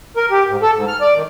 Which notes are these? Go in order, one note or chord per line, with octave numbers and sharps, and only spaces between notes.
A#4
G4
G#2
A4
G#2
F6
D5
D#3